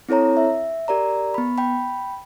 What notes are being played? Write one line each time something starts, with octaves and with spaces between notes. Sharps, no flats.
C4 E4 A4 C#5 A#5
E5
G4 A#4 D5 A#5
B3 B5
G5 B5